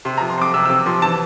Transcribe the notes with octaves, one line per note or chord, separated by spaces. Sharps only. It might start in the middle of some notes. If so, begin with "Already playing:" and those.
C3 C6
A#5
F3
C6
C4 D6
C3 E6
E6
C3 D6
F3 C6
E3 A5